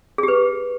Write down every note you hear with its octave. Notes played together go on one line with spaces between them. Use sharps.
G4 G#4 B4